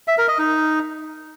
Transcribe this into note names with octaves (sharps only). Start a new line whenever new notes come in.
E5
A#4
D#5
D#4